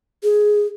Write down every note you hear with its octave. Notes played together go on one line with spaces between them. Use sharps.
G#4